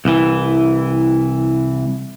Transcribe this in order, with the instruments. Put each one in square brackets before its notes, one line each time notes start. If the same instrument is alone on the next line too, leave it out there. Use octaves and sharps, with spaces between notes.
[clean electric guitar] C2 E3